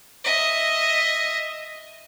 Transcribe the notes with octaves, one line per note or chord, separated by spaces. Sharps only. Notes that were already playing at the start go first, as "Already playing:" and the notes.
D#5 E5